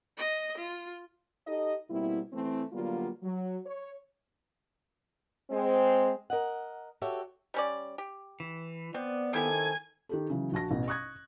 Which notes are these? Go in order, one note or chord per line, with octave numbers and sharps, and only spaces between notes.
D#5
F4
D#4 G4 A4 D#5
B2 G3 A#3 C4 E4
E3 A3 C4
D3 F#3 G3 A#3 B3 F4
F#3
C#5
G#3 C4
A#4 D#5 F#5
F#4 G4 A4 C#5 E5
G3 C#4 D5
G4
E3
B3 C4 D5
D#3 C4 E4 G4 A4 G#5
D#3 G4 A4
C#3 E3 F#3
A#1 F#4 A5 A#6
A1 B2
C#6 D#6 F#6 G#6